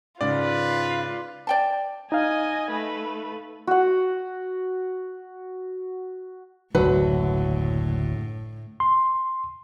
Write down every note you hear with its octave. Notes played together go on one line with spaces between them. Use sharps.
G#2 C#3 F4 B4 D5
D5 G5 A5
D#4 D#5 F5 G#5
A3 B4
F#4 F#5
F#1 D2 A2 D3 F#3 B4
C6